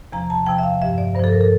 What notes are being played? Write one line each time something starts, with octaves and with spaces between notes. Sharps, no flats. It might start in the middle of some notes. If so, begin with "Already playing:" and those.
E2 C3 F3 A#5
A5
E2 C3 F3 G5
E5
F5
G2 F3 E5
D5
G2 F3 A4 C5
A#4
A4